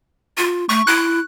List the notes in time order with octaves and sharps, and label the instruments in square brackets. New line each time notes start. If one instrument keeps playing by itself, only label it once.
[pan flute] F4
[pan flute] A3 [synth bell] C#6
[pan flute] E4 [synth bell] F#6